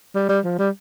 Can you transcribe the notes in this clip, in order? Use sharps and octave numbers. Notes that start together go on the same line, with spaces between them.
G3
G3
F3
G3